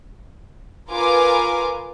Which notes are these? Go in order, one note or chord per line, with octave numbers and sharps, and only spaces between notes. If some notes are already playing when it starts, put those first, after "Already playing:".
F4 A#4 B4 G#5 D6